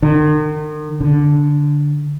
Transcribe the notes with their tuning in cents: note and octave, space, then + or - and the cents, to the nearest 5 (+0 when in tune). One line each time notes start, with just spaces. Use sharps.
D#3 -40
D3 -10